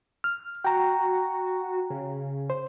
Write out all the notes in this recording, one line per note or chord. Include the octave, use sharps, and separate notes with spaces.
F6
F#4 G5 A#5
C#3
C5